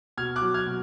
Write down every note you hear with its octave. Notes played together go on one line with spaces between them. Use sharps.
B2 F6 G#6
D6 F#6
F#3
F6 G#6
B2